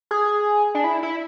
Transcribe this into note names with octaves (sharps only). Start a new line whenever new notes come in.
G#4
D4
E4
E4